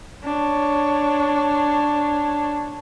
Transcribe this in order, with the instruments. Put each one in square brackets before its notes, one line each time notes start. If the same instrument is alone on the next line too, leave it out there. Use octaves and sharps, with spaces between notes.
[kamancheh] D4 C#5